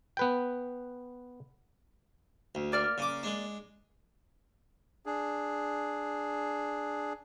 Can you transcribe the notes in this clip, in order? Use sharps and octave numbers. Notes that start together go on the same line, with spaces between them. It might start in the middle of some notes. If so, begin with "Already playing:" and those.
B3 B4 G5
D2
A#3 D5 F6
C#3 D6
G#3 D4
D4 G#4